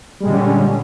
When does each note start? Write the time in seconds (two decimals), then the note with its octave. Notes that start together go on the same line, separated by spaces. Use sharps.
0.20 G3
0.23 G#3
0.26 A#2
0.29 D3
0.32 C#4